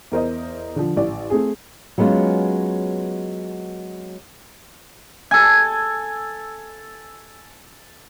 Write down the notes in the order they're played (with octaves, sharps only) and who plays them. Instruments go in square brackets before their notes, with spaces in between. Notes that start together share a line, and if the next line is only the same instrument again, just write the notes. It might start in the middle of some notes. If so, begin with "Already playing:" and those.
[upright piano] E2 A#4 C5 D#5
D3 F3
A1 D5
A3 C4 G#4
[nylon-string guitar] F#3 G#3 B3 C#4 F4
[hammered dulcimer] A4 G#5